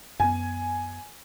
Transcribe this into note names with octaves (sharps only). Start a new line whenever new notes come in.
F#2 B3 G#5